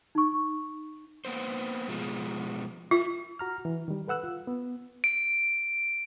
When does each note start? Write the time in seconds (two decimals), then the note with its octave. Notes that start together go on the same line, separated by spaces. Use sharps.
0.15 D#4 C#6
1.25 A#3 B3 C5
1.89 B2 F3 G#3
2.91 F4
3.39 F#4 A#5 F6
3.65 E3
3.88 D#3 G3
4.08 A4 B4 F#5 E6 F#6
4.23 F4
4.47 B3
5.04 D7